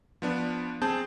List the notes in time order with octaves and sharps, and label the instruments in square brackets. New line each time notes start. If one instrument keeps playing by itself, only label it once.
[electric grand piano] F3 B3 D4
C4 G#4 A5 G6